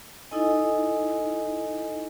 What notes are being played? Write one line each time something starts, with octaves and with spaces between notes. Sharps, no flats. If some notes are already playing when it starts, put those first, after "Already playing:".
D#4 E4 A4 D#5 G#5